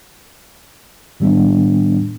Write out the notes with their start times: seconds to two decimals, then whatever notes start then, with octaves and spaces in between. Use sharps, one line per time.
1.20 A2 D#3 G3 B3 D4